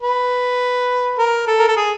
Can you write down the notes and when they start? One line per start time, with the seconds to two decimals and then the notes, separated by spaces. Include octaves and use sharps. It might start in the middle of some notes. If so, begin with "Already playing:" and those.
0.02 B4
1.18 A#4
1.47 A4
1.59 A#4
1.68 A4
1.76 G#4